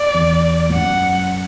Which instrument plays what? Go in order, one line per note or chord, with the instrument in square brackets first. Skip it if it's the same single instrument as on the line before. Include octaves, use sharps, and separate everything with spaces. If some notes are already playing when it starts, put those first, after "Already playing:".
Already playing: [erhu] D5
[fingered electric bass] E2
A2
[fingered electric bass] F#2 [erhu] F#5